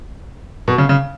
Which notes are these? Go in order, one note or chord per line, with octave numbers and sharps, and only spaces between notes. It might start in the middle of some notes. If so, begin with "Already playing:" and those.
B2
C#3
C#3